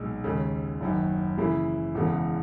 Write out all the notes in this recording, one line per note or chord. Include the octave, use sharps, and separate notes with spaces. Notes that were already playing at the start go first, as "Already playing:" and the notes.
Already playing: B1 A#2 G#3 D#4
D#2 C#3 G#3
F#1 F#2 D#3
C#3 E3 A#3 E4
E1 E2 C#3 E3